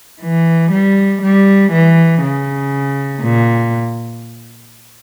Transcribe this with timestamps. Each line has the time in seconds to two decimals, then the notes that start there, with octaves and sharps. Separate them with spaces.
0.22 E3
0.72 G3
1.22 G3
1.72 E3
2.22 C#3
3.22 A#2